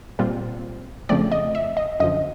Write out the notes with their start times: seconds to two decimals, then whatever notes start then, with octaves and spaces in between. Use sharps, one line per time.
0.19 A#2 G3 C4 F4
1.09 F2 C#3 F3 A3 C4 D5
1.32 D#5
1.55 E5
1.77 D#5
2.00 F#2 D3 F3 D#5